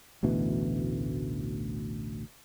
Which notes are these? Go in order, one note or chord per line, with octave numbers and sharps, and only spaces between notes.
A1 D2 B2 E3